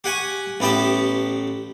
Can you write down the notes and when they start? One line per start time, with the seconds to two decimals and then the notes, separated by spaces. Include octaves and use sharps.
0.04 G4 F#5 G#5 C#6
0.60 A1 B3 G4 A5